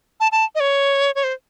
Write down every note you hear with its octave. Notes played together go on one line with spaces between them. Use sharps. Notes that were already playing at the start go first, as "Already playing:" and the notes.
A5
A5
D#5
C#5
C#5
C5